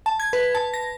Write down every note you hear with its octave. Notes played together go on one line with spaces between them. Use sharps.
A5
G#6
B4
A5
A#6